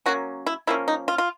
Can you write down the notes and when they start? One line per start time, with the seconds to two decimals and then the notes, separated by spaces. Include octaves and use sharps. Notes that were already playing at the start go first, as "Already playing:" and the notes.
0.06 F#3 A#3 C#4 F#4
0.46 E4
0.67 F3 A#3 C#4 E4
0.88 D#4
1.08 F4
1.18 F4